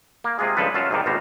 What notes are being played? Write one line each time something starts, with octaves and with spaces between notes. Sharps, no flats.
A#3
C3 G#3 F4 G#4
C#2 G2 F3 A4 B4
F#2 F#3 F4 A5
G#2 C3 D#3 G3
G#1 B2 G3 B3 C5 A#5